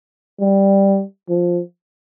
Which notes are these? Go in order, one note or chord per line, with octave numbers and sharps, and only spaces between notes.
G3
F3